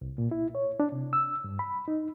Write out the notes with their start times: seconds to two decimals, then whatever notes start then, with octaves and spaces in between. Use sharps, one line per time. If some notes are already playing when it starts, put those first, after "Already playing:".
0.01 C2
0.18 A#2
0.31 E4
0.55 C#5
0.80 D4
0.92 C3
1.13 E6
1.44 G2
1.59 B5
1.88 D#4